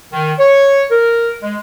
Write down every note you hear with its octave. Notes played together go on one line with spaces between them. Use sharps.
D#3
C#5
A#4
G#3